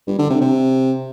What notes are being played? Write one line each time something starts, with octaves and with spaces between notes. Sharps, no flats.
G2
D3
C3
C3